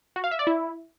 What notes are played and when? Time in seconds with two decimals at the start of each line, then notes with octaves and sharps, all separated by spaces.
0.16 F#4
0.24 F5
0.31 E5
0.39 D5
0.47 E4